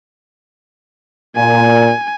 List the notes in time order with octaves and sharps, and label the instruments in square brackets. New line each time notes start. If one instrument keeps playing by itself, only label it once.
[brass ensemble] A#2 [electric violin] G#5